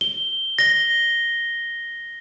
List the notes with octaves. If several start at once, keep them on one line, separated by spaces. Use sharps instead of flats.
G7
A#6 G7